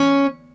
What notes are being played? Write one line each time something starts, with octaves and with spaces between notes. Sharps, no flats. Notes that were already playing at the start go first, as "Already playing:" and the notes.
Already playing: C#4